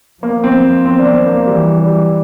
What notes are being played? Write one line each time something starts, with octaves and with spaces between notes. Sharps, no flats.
F3 A#3
C4
C4
D4
C4
A#3
E3 G3
G3